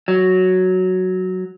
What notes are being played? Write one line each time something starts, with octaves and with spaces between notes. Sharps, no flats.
F#3